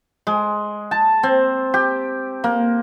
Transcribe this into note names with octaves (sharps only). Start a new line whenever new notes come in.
G#3
A5
C4
G4
A#3